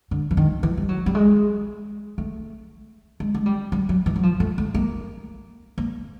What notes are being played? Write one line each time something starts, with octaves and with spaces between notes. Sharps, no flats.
D3
E3
D#3
E3
G3
F#3
G3
G#3
A3
G#3
G#3
G3
G3
F#3
E3
F#3
F3
A3
A3
A#3
A#3